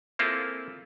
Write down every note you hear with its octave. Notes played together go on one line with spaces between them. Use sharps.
A#3 C4 E4 F4 G#4 A4